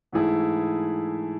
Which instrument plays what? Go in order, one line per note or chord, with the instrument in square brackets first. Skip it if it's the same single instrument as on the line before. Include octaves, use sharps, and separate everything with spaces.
[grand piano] G#2 E3 A3 E4 G#4